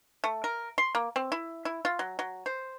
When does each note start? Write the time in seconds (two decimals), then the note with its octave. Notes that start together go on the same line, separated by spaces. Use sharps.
0.24 A3
0.44 A#4
0.78 C6
0.95 A#3
1.16 C4
1.32 E4
1.65 E4
1.85 F4
1.99 F#3
2.19 F#3
2.46 C5